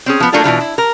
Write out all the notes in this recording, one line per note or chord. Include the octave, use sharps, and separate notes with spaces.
C4 C#4 G#4
F3 B3
F#3 A3 A#3 D4 F4 A4
B2 E3 G3 F4
E4
A#4